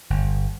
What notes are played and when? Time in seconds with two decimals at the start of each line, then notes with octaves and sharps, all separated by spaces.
0.10 G1